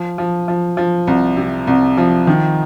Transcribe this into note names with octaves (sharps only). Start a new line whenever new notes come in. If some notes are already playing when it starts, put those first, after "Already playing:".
Already playing: F3
F3
F3
F3
C2
C3
C2
F3
D#3